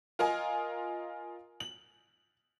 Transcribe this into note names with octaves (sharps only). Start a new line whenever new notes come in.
F4 A#4 D#5 G#5
F#7